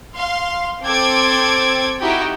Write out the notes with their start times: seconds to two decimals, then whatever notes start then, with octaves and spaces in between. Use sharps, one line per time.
0.16 F5 C6
0.83 C4 A4 C5 G5 D6 G#6
2.00 D#4 E4 F#4 G4 G5